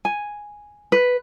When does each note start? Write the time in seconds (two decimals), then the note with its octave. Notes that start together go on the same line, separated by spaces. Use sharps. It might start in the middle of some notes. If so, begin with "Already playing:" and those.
0.05 G#5
0.92 B4